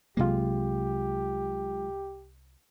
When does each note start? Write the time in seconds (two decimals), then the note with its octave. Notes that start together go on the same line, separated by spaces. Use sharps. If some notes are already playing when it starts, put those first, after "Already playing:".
0.17 C2 C3 F#3 G#3 A#3 F4 G4